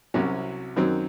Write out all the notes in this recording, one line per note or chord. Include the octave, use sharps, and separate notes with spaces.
C2 C3 F#3 C#4 F#4
F#2 D#3 F#3 C4